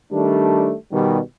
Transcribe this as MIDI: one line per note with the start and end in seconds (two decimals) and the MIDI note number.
0.12 0.74 51
0.12 0.74 55
0.12 0.74 57
0.12 0.74 62
0.92 1.19 47
0.92 1.19 51
0.92 1.19 55